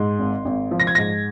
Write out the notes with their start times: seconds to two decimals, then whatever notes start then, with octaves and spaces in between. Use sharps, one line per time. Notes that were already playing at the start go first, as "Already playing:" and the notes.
Already playing: G#2 C6
0.19 G#1
0.45 G#1
0.71 F3
0.80 A#6
0.87 G#6
0.95 G#2 A#6